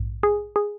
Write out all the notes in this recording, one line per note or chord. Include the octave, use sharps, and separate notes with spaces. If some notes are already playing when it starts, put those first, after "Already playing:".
Already playing: A#1 G#2
G#4
G#4